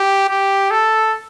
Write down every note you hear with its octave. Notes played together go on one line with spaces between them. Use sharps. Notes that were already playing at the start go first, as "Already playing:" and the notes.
Already playing: G4
G4
A4